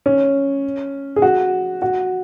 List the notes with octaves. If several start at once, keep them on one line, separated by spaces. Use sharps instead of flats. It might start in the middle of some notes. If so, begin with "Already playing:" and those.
C#4
G#4
F#4
F#4